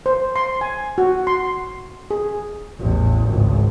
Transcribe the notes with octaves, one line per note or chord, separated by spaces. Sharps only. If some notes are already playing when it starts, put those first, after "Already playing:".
C5
C6
G#5
F#4
C6
G#4
A1 E2
G#1 C#2